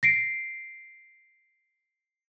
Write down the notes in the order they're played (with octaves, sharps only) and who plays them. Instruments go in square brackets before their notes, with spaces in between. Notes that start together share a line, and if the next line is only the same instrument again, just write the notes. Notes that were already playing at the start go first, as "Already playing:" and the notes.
[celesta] A#6 C7 D7